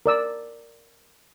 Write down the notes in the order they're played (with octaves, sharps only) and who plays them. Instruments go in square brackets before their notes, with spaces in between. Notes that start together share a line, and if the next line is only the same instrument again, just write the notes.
[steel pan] A#4 D5 E6